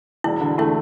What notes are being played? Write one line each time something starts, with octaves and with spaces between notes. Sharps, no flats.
E1 E4
D3
A3 E4